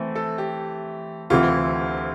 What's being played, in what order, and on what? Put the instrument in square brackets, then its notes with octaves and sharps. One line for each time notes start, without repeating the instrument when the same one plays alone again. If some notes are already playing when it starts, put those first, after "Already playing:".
Already playing: [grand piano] E3 A3 C4
[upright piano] A4
G4
[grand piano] D2 C3 E3 [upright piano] F4